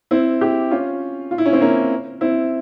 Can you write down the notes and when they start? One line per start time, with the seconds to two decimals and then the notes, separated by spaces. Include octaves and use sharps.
0.11 C4 E4
0.41 E4 G4
0.71 C#4 F4
1.31 F4
1.38 E4
1.46 C#4
1.53 C4 E4
1.61 A#3 C#4
2.21 C4 E4